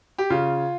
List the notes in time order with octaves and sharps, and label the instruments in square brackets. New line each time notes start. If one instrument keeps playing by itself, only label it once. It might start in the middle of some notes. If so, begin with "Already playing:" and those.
[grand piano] G4
C#3 F4